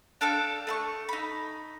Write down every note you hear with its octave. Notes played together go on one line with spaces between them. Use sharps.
D4 A4 F5 G5
A3 C6 C#6
D#4 B5